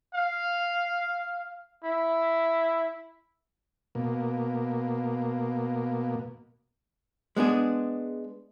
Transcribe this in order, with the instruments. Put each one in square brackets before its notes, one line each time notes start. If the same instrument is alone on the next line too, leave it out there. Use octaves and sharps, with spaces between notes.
[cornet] F5
E4
[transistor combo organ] B2 A#3
[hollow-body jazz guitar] G#3 B3 D4 G#4